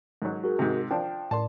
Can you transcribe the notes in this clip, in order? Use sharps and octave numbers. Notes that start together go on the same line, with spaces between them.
G#2 F#3
F#4 G#4 A#4
G#2 C3
F3 D4 G5
A2 D5 A5 C6